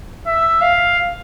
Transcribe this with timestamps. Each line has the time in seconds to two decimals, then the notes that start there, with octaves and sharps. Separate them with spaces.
0.27 E5
0.61 F5